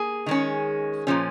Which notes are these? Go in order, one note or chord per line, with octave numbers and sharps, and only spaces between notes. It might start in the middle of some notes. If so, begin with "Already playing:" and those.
Already playing: A#3 G#4
D#3 G#3 C#4
A#2 F3 C#4